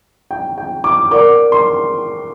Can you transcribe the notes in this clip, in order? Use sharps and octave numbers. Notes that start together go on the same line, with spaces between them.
G5
G5
D6
A#4 D5 F#5 D6
C6